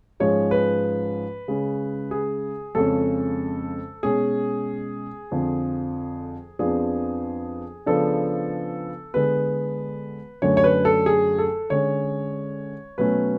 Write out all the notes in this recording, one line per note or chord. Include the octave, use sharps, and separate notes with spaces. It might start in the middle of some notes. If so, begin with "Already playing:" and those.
G#2 F3 G#3 C#4 C#5
B4
C#3 G#3 C#4
G#4
F2 C#3 G#3 C#4 A4
B2 G#3 C#4 G#4
F2 D3 F3
F2 F3 B3 D4 G#4
C#3 F3 B3 D4 A4
D3 G#3 B3 B4
F#2 D3 F#3 A3 D4 C#5
C#5
B4
A4
G#4
A4
D3 G#3 C#4 C#5
B2 F#3 A3 C#4 B4